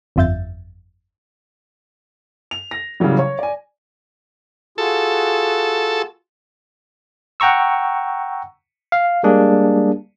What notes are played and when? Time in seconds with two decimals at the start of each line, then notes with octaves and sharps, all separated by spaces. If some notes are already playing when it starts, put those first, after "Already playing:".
0.16 G1 F2 F4 E5 G6 A6
2.51 F7
2.71 A#6
3.00 A2 C#3 E3 F#3 G3
3.19 C#5
3.39 D5 G#5
4.78 F4 F#4 G#4 A4
7.40 F#5 G5 A#5 C#6 E6
8.92 F5
9.23 G3 G#3 A#3 D4 G#4